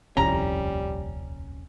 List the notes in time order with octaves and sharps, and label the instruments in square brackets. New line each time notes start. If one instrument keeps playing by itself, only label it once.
[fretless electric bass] D#1 C2 F2 [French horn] G3 [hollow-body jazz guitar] C#4 [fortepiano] A#5